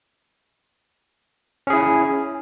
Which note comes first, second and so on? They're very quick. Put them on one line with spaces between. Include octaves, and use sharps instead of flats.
C#4 G#4 E4